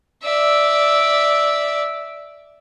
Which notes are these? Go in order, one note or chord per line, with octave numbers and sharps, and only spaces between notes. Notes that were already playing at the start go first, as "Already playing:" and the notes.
D5 E5